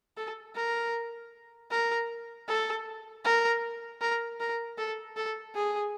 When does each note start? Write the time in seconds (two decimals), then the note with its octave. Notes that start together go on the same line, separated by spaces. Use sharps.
0.17 A4
0.55 A#4
1.71 A#4
2.48 A4
3.24 A#4
4.01 A#4
4.40 A#4
4.77 A4
5.16 A4
5.55 G#4